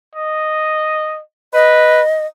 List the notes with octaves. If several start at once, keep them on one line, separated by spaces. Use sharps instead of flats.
D#5
B4 D#5